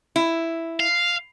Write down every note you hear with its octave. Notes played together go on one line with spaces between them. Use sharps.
E4
F5